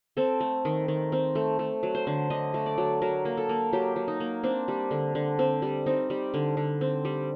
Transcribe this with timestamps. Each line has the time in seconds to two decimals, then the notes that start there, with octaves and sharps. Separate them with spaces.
0.17 C4 A4
0.40 A3
0.65 D#3
0.88 D#3
1.12 C4
1.35 A3
1.59 A3
1.83 F#3
1.95 C5
2.07 D3
2.30 D3 D#5
2.54 A3
2.66 D5
2.78 F#3
3.02 F#3 A#4
3.25 A#3
3.37 A4
3.49 A#3
3.73 F#3 G4
3.96 F#3
4.08 D#4
4.20 A#3
4.43 C4 D4
4.68 G3
4.91 D3
5.15 D3
5.39 C4
5.62 G3
5.86 C4 D#4
6.10 G3
6.34 D3
6.57 D3
6.81 C4
7.05 G3